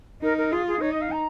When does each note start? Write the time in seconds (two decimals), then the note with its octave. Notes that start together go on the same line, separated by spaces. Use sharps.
0.22 D#4 A#4
0.37 A#4
0.51 F4 G#4
0.67 G#4
0.81 D#4 C#5
0.91 D#5
1.01 F5
1.12 A#5